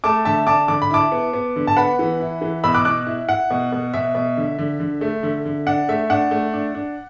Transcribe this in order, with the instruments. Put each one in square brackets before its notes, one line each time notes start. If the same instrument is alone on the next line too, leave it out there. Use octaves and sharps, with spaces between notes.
[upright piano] A3 A5 D6
D3 E5 A5
D4 A5 D6
D3 D6
B5
E4 A5 D6
B3
B3
D3
A5
B3 F#5 B5
E3
E4
E3
B2 B5 E6
D6 F#6
B2 D6 F#6
E4
E4 F#5
B2
B2
B2 E5
B2
D3
D3
D3
A3
D3
D3
D4 F#5
A3 E5
D4 F#5
A3
D4
D4